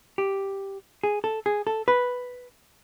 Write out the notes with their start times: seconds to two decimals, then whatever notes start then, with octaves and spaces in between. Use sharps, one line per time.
0.18 G4
1.04 G#4
1.24 A4
1.46 G#4
1.67 A4
1.88 B4